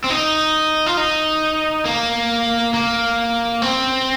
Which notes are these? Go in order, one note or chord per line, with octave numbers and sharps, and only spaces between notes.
C4
D#4
F4
D#4
A#3
A#3
C4